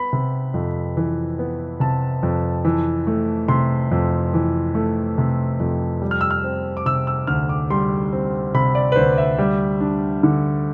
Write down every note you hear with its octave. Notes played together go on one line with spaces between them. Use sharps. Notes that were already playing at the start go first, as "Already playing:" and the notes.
Already playing: B3 B5
C3
F2
E3
B3
C3 A5
F2
E3
A3
C3 C6
F2
E3
A3
C3
F2
G3
F6
E6
F6
C4
D6
C3 E6
E6
D2 F6
D6
G3 C6
C4
C3 B5
D5
B4
D2 C5
E5
G3
D4
D3